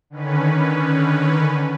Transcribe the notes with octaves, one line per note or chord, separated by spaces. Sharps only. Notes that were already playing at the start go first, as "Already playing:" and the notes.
D3 D#3 C#4 B4